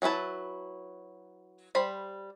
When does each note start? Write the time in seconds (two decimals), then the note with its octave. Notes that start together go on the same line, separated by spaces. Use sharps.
0.02 F#3 G#3 E4 B4 A5
1.75 G3 C5 B5